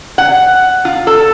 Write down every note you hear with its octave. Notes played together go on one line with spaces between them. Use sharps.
F#5
F4
A4